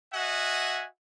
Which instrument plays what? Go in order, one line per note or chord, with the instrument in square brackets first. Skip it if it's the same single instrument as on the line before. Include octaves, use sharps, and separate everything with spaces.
[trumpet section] F#4 D#5 E5 F#5 G#5